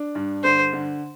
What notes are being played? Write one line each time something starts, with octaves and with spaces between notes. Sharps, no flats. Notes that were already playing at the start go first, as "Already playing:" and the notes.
Already playing: D4
G2
D3 C5
D3